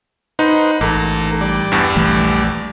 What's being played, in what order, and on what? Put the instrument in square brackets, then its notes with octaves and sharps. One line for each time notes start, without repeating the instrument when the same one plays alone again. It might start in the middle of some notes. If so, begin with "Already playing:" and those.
[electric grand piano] D#4 [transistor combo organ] B4 C5 F#5
[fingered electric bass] A1 [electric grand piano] G#2 [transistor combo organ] A4 A#4
[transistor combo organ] G3 D5
[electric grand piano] E2 G2
[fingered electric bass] A#1 E3 A3